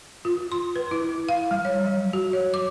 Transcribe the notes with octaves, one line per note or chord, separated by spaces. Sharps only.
F4
C6
B4
E4
F5
G3
C#5
F#3
F#4
C#5
D6